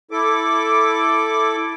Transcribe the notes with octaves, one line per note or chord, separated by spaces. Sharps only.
E4 A4 D6